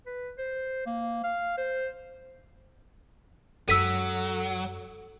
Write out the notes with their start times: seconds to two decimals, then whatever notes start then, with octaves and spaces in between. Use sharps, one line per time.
0.06 B4
0.38 C5
0.86 A#3
1.24 F5
1.57 C5
3.69 F#2 F#3 G#3 A4 E6 B6 D#7